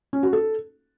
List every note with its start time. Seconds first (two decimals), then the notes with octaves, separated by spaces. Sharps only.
0.13 C#4
0.23 F#4
0.33 A4